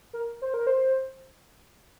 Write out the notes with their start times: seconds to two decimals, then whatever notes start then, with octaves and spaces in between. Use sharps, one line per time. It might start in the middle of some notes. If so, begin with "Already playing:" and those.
0.13 A#4
0.42 C5
0.54 A#4
0.67 C5